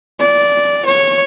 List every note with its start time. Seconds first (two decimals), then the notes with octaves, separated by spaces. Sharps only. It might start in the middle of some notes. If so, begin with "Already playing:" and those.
0.20 D5
0.85 C#5